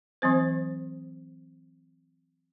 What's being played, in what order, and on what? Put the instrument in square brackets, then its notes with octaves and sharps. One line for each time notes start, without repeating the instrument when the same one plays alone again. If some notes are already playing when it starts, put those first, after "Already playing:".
[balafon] E3 F#3 C4 C5